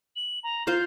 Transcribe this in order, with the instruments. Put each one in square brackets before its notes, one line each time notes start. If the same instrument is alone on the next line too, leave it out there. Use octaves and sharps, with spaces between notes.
[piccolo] F#7
A#5
[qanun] F4 C5 F5 [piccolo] G6